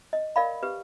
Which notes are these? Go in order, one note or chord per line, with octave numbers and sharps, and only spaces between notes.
D#5
A#4 D5 F5 B5
G4 B4